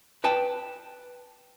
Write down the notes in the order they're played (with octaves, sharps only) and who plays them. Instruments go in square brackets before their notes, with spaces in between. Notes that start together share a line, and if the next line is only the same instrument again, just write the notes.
[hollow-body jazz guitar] B4 G5 A5